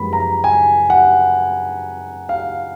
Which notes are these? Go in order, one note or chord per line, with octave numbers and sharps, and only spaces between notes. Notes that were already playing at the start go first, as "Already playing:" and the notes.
Already playing: F#2 F3 G#3 B3 B5
A#5
G#5
F#5
F5